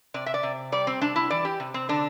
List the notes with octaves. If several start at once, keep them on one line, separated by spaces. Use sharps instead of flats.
C3 D5
E5
D5
C3
G3 D5
C4
C3 D4
E4
E3 D5
G4
C3
C4
D3 D4